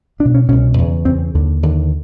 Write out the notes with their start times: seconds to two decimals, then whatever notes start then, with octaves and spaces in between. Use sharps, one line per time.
0.19 C2 D4
0.25 B2
0.34 C#4
0.49 C2 B2 C#4
0.78 E2 C#3
1.05 E2 C4
1.08 C#3
1.35 D#2 D3
1.63 D#2 D3